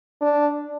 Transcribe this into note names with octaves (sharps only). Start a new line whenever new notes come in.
D4